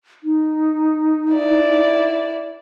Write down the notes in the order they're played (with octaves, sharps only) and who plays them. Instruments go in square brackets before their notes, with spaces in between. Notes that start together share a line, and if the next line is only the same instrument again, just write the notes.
[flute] D#4
[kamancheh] E4 D5